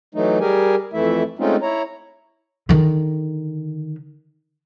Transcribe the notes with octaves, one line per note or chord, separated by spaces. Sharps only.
E3 F#3 A3 D#4
G3 G4 G#4 A#4 G#5
F2 E3 A3 E4 E5
G#3 A3 C4 C#4 D#4 F4
E4 C#5 A#5
D3 D#3